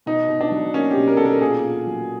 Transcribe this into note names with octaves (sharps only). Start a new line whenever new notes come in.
B2 D#4
B2
D4
F#3
A#3 C#4
G4
B2
A#4
B2 A4
A#4
A#2 G#4
A#2
F#3